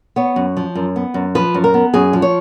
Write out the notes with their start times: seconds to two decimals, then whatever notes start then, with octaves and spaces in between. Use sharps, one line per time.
0.16 B3 C#5
0.36 F#2
0.57 F3
0.75 F#2
0.96 B3
1.14 F#2
1.35 F3 B4
1.54 F#2
1.64 A#4
1.74 B3
1.94 F#2 G#4
2.13 F3
2.22 C#5